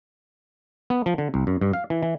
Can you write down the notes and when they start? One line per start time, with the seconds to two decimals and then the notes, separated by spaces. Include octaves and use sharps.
0.90 B3
1.06 F3
1.18 D3
1.34 C2
1.47 F#2
1.61 G2
1.73 F5
1.90 E3
2.03 E3